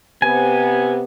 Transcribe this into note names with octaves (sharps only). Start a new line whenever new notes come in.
C3 B3 G#5